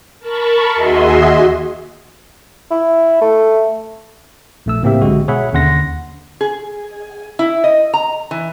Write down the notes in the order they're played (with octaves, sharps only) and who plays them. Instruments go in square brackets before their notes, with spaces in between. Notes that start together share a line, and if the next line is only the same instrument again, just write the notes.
[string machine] A#4 A5 B5 C#6
D#2 F#4 G#4 D#5 E5 C6
[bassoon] E4
A3
[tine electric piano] A#1 A3 E6
A2 C#3 A#3 C4 G4 E5
B1 D3 G#3 F#4
B2 G#4 C#5 E5 F#5 B5
D#2 D3 C#4 F#5 C6 A#6
[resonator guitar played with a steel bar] G#4
E4
D#5
A#5
E3